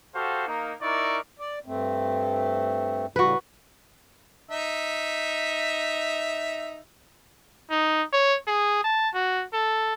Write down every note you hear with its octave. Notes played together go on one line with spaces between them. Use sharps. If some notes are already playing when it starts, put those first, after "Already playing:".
F#4 G4 A4 C5 F5
A#3 D#4
D#4 E4 A#4 D5 C#6
D5
G2 A3 C4
A2 C#3 G3 F#4 B4
D#4 E5
D#4
C#5
G#4
A5
F#4
A4